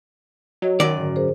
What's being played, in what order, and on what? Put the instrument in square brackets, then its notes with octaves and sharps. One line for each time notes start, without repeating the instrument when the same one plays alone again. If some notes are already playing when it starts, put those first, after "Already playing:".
[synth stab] F#3 [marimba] F#4 C#5 D#5
[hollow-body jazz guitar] F#2 D5 [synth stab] D#3
[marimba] G#2 D3
G#4 A#4 C5